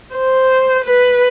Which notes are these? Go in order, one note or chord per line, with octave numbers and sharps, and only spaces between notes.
C5
B4